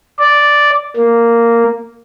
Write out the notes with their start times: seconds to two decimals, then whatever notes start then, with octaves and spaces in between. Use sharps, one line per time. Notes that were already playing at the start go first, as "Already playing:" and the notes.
0.19 D5
0.97 A#3